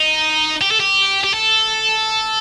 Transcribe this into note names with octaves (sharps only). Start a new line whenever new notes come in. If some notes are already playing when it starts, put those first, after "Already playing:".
Already playing: D#4
G4
A4
G4
G4
A4